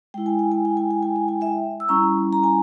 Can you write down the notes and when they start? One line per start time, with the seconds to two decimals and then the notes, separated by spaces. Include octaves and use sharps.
0.14 G#3 E4 G5
0.26 G#5
0.39 G5
0.52 G#5
0.65 G5
0.77 G#5
0.91 G5
1.03 G#5
1.16 G5
1.28 G#5
1.41 E5 G5
1.80 E6
1.89 G3 C#4 E4 A#5 C#6
2.33 A#5
2.44 G#5